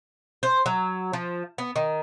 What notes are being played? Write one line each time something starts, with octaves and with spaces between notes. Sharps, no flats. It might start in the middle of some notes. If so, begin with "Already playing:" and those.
C5
F#3
F3
B3
D#3